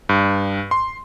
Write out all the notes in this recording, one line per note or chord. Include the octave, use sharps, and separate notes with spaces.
G2
C6